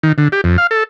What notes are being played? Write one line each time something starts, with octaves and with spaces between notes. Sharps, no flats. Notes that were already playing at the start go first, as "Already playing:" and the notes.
D#3
D3
G4
F2
F5
A4